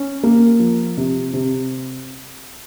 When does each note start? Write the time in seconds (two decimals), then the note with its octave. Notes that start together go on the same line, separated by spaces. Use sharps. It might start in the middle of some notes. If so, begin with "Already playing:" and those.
Already playing: C#4
0.23 A#3
0.59 F3
0.97 C3
1.34 C3